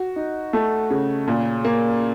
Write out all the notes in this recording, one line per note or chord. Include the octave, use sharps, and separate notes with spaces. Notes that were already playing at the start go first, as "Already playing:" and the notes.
Already playing: F#4
D#4
A3
C#3
A#2
A#3